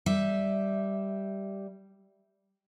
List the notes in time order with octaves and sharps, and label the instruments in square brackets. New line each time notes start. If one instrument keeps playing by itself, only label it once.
[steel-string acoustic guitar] G3 E5